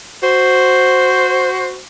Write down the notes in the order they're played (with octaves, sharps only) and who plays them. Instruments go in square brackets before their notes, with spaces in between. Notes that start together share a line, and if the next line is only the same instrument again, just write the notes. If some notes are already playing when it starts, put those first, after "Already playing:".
[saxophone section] F#4 C5